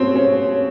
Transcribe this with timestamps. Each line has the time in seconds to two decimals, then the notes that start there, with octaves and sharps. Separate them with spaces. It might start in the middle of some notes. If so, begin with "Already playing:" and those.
Already playing: B2 G3 A#3 C4 C#4
0.15 C#4